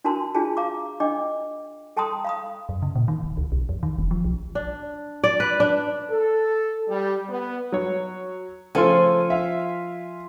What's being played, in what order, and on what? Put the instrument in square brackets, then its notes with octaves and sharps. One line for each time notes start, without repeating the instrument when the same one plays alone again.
[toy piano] D4 F#4 A#4 A5 C6
D4 F4 F#4 G#4 A5
F5 A#5 D6
D4 D#5 G5 D6
A4 G5 A5 A#5 C6 D#6
F5 B5 D#6
[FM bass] F#2
C#3
A#2
D#3
D1
C#2
B1
F2
D#3
F1
F3
B1
[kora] D4
D5
B4
D4
[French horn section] A4
G3
B3
[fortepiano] F#3 C#5
[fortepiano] C#3 A3 A4 [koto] F3 [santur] F4 G#5
[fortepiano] E5 F5